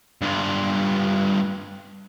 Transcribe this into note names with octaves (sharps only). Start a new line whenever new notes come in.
G2 F4